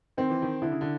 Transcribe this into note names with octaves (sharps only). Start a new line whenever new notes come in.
D#3 C4
E3
D#3
D3 E4
C#3
D3